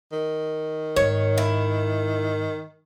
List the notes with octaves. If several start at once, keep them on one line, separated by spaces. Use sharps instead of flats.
D#3
G#2 C#5
E4